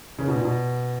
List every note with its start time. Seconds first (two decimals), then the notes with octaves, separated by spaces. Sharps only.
0.19 C#3
0.28 B2
0.36 A#2
0.45 B2